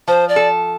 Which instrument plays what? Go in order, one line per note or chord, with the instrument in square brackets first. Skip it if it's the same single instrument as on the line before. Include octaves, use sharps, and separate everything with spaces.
[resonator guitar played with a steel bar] F3 [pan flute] C5
[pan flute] D5
[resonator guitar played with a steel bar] A4